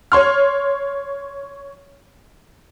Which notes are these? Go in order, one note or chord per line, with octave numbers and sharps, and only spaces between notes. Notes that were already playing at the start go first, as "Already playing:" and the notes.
C#5 C6 F6